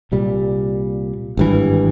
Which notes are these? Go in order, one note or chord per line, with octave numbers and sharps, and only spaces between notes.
C2 A#2 G3
G#1 G2 E3